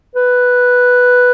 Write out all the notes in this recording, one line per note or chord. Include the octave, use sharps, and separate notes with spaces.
B4